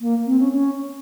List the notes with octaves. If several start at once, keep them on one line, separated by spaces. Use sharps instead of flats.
A#3
C4
C#4
C#4